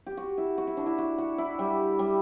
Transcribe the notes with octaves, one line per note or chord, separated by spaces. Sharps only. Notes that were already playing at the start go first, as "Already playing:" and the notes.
G4
F#4
E4
F#4
E4
D4
E4
F#4
F#4
E4
G3
G3